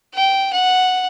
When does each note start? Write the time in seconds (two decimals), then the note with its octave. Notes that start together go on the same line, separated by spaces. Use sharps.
0.14 G5
0.53 F#5